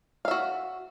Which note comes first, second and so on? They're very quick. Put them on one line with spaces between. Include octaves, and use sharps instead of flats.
F5 E5 F#4